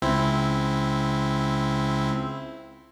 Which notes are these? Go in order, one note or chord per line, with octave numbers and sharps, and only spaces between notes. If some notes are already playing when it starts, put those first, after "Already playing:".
C#2 C4 E4